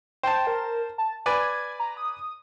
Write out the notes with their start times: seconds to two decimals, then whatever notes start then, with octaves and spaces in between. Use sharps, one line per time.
0.23 C5 G5 A5
0.47 A#4
0.98 A5
1.26 B4 D5 G#5 G#6
1.79 A#5
1.97 D#6